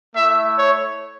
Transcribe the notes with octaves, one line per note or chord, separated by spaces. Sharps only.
A3 E4 E5
C#5